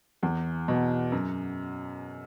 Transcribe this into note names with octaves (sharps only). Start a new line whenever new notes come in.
E2
B2
F#2